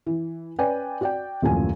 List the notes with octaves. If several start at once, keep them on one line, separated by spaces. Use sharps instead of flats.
E3
C#4 B4 D5 G5 G#5
F#4 D5 G5
D#1 F#2 A2 F3 G#5